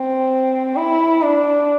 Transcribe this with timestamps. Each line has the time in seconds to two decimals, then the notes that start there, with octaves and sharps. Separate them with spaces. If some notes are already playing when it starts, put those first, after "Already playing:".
Already playing: C4
0.76 E4
1.23 D4